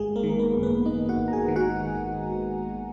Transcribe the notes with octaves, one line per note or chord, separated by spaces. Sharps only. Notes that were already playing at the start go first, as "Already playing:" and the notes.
Already playing: G#1 G#3 G#4
A#3 A#4
D#3
A#4
B3 B4
F#2
B3 B4
A#3 D#4 D#5
F#4 F#5
G#1
A#5
G#4 G#5
D#3
F#4 F#5